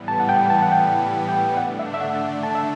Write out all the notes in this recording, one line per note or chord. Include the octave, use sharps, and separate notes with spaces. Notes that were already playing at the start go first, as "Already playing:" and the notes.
Already playing: A2 E3 G3 B3
A5
F#5
G5
A5
F#5
G5
G5
D3 A3 D4 F#5
E5
E5
F#5
A5
E5